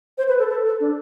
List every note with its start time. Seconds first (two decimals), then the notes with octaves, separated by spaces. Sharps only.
0.18 C5
0.28 B4
0.39 A4
0.49 A4
0.65 A4
0.80 D4